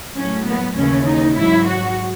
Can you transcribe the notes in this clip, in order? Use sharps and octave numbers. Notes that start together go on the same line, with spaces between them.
A2 F#3 C#4
B3
D#2 C#3 E3 C#4
D#4
G#2 F#3 E4
F#4